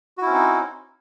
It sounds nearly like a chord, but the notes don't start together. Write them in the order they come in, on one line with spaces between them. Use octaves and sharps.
F#4 E4 C#4 C4 D#4